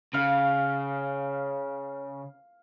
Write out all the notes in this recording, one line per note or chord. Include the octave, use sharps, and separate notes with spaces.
C#3 F5